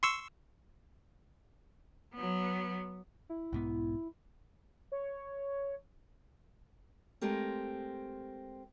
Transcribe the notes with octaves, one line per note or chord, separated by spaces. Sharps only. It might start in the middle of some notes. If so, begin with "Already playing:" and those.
C6 C#6 E6
F#3 B3
E4
B1 G#2 B3
C#5
G#3 A3 C4 G4 A#4